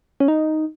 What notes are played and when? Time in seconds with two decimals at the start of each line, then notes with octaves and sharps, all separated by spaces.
0.20 C#4
0.28 D#4